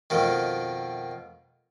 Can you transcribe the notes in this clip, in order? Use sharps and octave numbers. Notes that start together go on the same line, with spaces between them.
F2 B2 D#3